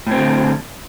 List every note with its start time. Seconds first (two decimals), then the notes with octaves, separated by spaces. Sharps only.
0.07 A2
0.11 C4
0.16 D3